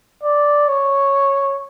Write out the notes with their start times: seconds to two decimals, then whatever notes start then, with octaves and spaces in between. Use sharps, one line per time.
0.23 D5
0.68 C#5